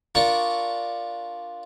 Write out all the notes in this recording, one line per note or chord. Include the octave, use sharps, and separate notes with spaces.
D4 F4 A#4 C#6